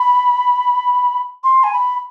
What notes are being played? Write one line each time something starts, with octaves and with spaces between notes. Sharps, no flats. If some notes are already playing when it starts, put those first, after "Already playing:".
Already playing: B5
C6
G#5
B5